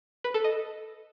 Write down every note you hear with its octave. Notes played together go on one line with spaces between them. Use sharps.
B4
A4
D#5